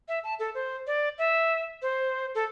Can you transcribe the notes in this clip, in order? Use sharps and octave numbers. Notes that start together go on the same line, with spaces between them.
E5
A5
A4
C5
D5
E5
C5
A4